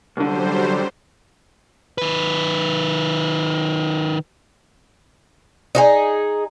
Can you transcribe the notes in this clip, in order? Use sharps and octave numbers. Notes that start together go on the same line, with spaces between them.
C2 D3 F#3 G3 C5
D#3 B4
D#4 F4 G#4